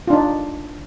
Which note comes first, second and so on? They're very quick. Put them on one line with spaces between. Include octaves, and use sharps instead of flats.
F4 D4 D#4